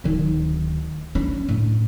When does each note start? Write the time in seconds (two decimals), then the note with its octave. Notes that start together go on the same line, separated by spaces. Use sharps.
0.04 D1 D#3
1.15 C#4 D4
1.49 A2